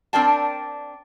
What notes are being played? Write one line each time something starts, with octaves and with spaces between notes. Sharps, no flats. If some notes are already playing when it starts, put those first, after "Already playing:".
C4 D4 A#4 D5 G5 A5